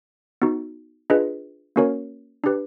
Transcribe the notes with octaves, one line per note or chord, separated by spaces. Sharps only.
B3 D#4 F#4
D4 F4 G#4 B4 D#5
A#3 C#4 F#4 A#4 C#5
D4 G4 B4